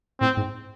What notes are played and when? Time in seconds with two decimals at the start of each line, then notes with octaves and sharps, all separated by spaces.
0.20 A2 C4
0.37 G#2